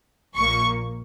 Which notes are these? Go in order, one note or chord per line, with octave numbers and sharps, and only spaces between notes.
A#1 A#2 A#3 C#6